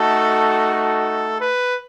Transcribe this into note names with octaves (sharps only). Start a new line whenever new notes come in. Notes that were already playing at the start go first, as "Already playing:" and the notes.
Already playing: A3 D#4 F#4 A4
A4
B4